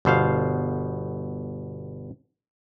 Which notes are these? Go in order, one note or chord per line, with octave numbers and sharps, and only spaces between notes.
G1 B2 C5 F5